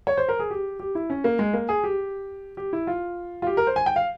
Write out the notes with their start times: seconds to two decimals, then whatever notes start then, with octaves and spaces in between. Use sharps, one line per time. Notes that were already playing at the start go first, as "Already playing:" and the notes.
0.07 C#5
0.17 C5
0.29 A#4
0.39 G#4
0.50 G4
0.80 G4
0.95 E4
1.10 C#4
1.24 A#3
1.39 G#3
1.54 A#3
1.69 G#4
1.84 G4
2.57 G4
2.73 E4
2.87 F4
3.42 F4
3.47 G4
3.57 A#4
3.67 C5
3.76 G#5
3.86 G5
3.96 F5